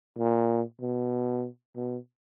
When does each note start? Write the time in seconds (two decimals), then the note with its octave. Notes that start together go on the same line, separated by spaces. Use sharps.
0.18 A#2
0.80 B2
1.75 B2